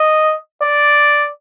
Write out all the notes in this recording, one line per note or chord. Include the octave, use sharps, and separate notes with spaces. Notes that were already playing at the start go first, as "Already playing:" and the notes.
Already playing: D#5
D5